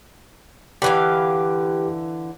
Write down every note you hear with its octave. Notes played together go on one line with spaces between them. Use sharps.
D3 E3 G4 B4 F5 D6